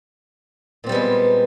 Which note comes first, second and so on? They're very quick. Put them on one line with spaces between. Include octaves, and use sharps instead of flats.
A#2 C4 G3 B3 G#3